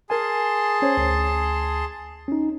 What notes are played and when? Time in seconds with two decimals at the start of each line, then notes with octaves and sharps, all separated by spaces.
0.10 G#4 A#4 G#5 A5 C6
0.82 C#4 C5 C#5
0.97 D2
2.28 C#4 D#4